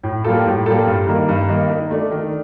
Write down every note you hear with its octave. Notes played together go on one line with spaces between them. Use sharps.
A2
G3 A#3 F4 A4
A2
G3 A#3 F4 A4
G2
D#3 A#3 D#4
G2
D#3 A#3 D#4
D#3
A3 D4
D#3